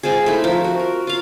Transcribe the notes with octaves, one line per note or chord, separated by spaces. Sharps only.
G#3 C4 F4 G#4
A3 D#4 E4
F3 A#4 E5
F#4
A#4
F4 F5